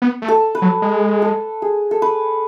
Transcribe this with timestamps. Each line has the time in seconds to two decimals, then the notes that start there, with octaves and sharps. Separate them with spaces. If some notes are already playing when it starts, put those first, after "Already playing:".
0.02 B3
0.22 A3
0.28 A4
0.55 B4
0.62 F#3
0.82 G#3
1.22 A4
1.62 G#4
1.91 A4
2.02 B4